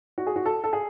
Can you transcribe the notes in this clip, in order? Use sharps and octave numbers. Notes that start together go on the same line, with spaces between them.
F#4
G#4
F#4
A4
A4
G#4